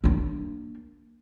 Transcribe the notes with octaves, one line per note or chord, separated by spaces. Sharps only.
A#3 D4